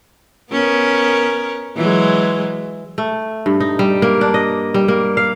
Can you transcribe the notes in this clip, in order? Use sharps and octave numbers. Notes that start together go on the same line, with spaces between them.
B3 C#4 A#4
E3 F#3 G#3
A3
G2
D#4
G3
A#3
D4
D#5
G3
A#3
F5